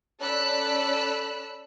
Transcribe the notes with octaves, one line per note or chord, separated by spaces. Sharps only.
C#4 A4 D5 B5 E6 F#6